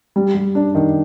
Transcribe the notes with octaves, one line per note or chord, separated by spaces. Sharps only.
G3
G3
D4
D#3